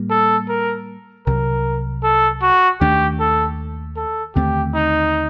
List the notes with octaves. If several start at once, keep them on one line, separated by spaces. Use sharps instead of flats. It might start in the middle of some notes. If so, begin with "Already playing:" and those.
Already playing: A2 G3 A#3
A4
A#4
C2 C3 F#3 A#4
A4
F#4
D#2 D#3 A3 D4 G4
A4
A4
D#2 D3 A3 C4 G4
D#4